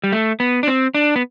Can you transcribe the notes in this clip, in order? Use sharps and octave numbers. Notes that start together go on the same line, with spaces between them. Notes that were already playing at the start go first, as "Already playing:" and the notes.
G3
A3
B3
D4
C4
D4
B3